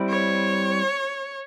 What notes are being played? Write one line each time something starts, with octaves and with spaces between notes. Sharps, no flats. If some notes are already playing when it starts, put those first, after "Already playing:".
Already playing: G3 C4 E4
C#5